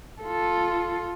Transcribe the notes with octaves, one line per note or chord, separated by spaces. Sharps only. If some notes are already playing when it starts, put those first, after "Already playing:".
F4 A4